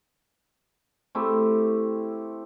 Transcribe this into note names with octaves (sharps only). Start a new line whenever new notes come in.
A3 C4 E4 G4